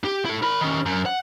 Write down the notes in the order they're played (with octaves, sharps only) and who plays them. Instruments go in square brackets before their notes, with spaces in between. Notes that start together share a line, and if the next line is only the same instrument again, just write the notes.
[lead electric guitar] G4
E4 A4
A#4 B5
D#3 C#4
F#2
F#5